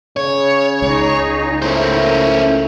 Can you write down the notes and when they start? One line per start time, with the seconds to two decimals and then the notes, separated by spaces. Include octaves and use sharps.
0.17 C#3 C#5
0.82 C#2 D#4 G#4
1.62 A3 C#4 E4 A#4 C5